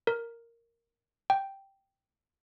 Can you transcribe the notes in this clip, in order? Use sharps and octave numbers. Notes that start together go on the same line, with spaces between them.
A#4
G5